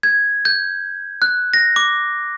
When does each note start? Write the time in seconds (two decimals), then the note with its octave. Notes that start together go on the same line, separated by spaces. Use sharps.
0.03 G#6
0.45 G6
1.22 F#6
1.54 A#6
1.76 D6